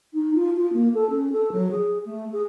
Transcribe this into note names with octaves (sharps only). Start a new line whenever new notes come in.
D#4
F4
F4
A#3
A4
C#4
A4
F#3
G#4
A3
G#4